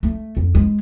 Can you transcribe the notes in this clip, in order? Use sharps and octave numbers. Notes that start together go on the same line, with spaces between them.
A3
F2
G#3